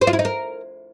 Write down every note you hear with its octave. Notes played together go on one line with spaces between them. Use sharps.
C5
F4
E4
D#4
A#4